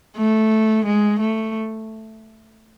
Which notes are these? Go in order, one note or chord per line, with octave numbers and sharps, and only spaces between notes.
A3
G#3
A3